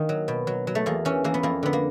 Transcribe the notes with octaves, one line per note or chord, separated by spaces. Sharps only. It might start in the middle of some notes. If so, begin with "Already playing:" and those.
Already playing: D#3 A#3
F#3
B2
F#3
F#3
A3
E2 A#3
E3 C#4
E3 A#3
B3
F2 A#3
D3 B3
A#3